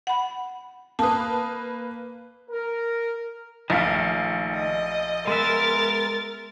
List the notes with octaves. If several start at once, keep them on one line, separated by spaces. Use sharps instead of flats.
F#5 B5
A#3 B4 A5 D#6
A#4
A#1 D#3 A3 F5
D#5
G#3 B3 A#4 E5 A6